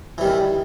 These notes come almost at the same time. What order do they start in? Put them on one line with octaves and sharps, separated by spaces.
E3 G3 D#3